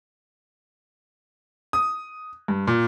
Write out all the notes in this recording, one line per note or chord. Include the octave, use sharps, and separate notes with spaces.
D#6
G2
A#2